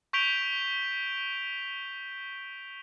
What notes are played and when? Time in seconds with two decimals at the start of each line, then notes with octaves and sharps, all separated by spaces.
0.13 C#6 G6 B6 D7 F7 G7